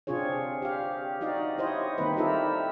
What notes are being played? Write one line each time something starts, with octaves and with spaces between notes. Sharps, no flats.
C3 C4 D4 F4 G#4 C#5
G4 F5
D#4 F#4 D5 D#5 F5
E4 G4 C5 C#5 D#5
D#3 G3 A#3 C4 D#4 B4
E4 F4 G4 A4 A#4 E5